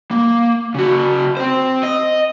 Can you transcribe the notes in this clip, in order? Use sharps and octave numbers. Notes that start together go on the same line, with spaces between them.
A#3
C#3 F#4
C4 C5
D#5